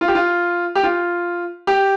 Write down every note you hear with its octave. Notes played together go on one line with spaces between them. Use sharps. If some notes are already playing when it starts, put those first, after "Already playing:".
F4
G4
F4
G4
F4
G4